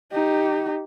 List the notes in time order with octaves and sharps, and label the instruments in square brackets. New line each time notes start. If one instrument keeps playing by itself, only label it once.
[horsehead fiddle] D#4 G4